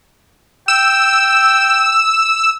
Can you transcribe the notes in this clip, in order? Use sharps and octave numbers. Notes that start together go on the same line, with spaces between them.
G5 E6